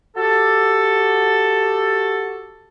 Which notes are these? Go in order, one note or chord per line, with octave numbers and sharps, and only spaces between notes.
F#4 G4 A4